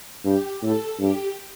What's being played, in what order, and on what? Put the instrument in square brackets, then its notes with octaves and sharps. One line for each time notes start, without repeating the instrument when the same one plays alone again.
[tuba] G2 [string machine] G4
[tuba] A2 [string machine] A4
[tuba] G2 [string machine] G4